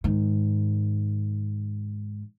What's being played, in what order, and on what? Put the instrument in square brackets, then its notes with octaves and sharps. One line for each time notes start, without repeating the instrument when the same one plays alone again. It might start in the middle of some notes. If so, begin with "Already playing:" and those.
[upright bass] G#2 D#3